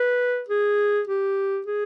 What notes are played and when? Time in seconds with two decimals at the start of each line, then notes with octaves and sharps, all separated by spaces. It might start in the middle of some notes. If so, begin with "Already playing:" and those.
Already playing: B4
0.48 G#4
1.07 G4
1.67 G#4